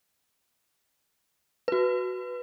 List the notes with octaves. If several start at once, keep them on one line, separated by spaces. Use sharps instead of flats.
F#4 B4